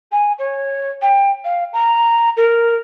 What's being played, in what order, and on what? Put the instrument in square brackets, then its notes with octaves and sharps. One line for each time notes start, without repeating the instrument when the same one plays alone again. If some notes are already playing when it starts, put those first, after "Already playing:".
[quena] G#5
C#5
G5
F5
A#5
A#4